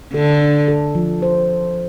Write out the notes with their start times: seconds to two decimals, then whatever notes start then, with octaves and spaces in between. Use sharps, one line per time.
0.13 D3 A4
0.41 D4
0.68 A4
0.95 F3
1.22 C5